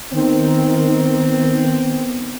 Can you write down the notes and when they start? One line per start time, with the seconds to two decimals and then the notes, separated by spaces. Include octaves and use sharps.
0.12 D#3 B3 C4